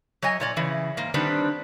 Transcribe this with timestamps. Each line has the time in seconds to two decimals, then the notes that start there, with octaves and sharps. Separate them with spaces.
0.22 F#3 C#5 D#5 G#5
0.40 A#2 C#5 D5
0.57 C#3 E3
0.97 G#2 A#3
1.14 D3 D#3 G3 B3 C4 D4